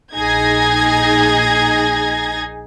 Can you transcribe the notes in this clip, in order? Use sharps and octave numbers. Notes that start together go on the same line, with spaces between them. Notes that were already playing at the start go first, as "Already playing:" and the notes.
A#1 D#4 G#4 G#6 A#6